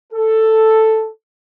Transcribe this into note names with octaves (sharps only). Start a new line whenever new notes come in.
A4